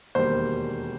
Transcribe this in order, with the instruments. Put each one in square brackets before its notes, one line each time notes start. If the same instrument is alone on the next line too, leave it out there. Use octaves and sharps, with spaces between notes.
[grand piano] E1 D#2 D#3 G3 A#3 C5